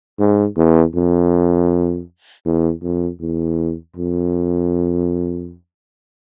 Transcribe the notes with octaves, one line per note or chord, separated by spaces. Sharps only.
G#2
E2
F2
E2
F2
E2
F2